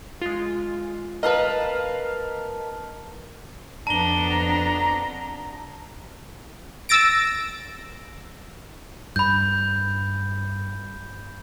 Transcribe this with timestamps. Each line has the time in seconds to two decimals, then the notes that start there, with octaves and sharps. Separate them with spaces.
0.22 G#3 F4
1.23 A#4 B4 D#5 F5 A5
3.87 F2 B3 D4 A5 A#5 G7
6.89 E6 A6 A#6 D7
9.16 G2 B5 G6